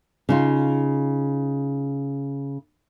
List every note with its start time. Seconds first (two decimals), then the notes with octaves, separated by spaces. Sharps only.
0.29 C#3 D#4 F4